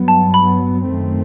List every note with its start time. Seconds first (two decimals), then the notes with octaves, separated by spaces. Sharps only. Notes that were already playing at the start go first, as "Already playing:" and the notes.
Already playing: G2 F#3 B3
0.08 A5
0.34 B5
0.85 F#2 D#3 A3 C4